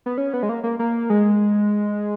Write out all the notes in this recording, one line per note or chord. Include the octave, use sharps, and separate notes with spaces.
B3
C#4
B3
G#3
A#3
A#3
A#3
G#3